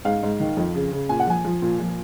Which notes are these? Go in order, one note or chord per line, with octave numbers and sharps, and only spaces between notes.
G#2 F5
G#2
D#3
F2
C#3
C#3
A#2 G#5
F#5
F3 G#5
F3
A#2
F3